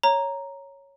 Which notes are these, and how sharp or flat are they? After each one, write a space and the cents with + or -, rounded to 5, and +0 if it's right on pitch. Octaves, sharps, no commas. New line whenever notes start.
C#5 +0 A#5 +0